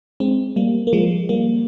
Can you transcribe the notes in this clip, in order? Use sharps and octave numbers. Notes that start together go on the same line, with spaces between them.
G#3 C4
G3 A#3
A#3
F3 G#3
G3 A#3